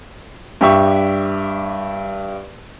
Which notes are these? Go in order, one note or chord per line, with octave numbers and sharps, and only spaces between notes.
G2 G4 E5 C#6